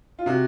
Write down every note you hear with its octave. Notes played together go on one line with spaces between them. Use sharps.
F4
C3 F#4